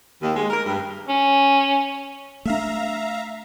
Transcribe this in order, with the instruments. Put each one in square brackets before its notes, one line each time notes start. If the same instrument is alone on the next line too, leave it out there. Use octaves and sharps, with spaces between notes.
[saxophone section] D#2
G#3
A#4
G2
[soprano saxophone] C#4
[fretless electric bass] A3 D4 [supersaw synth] E5 F5 A#5